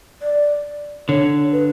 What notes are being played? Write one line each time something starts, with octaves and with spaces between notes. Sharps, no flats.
D5
D3 C#5
B4